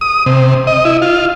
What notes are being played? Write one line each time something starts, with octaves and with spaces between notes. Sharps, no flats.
D#6
C3
D#5
E4
F4